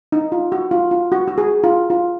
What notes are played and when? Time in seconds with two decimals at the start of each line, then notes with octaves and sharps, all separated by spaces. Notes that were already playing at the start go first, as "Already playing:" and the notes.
0.12 D#4
0.32 F4
0.52 F#4
0.71 F4
0.91 F4
1.12 F#4
1.28 F#4
1.38 G#4
1.64 F4
1.90 F4